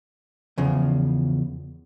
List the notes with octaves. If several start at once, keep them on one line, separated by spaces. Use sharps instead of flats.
E2 C#3 F3